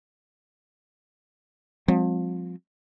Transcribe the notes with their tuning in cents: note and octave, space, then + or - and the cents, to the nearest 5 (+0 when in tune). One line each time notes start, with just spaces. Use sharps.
F3 +30 G#3 -35 C4 +0